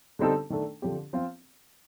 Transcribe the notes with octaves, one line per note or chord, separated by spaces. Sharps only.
D3 G3 C4 D#4 A4
D#3 A3 D4 A4
D3 F3 C4 G4
F3 C4 F4